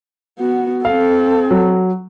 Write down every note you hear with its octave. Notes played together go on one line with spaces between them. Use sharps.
B3 F#4
C4 A4 F5
F#3